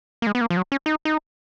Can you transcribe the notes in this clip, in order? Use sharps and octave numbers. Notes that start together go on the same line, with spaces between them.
A#3
G#3
B3
A#3
F3
F#3
C#4
D#4
D#4